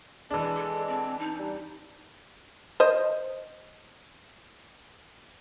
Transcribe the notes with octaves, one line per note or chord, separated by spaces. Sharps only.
E3 G#3 D4 A5
A4
C4
D#4
G3
C5 D#5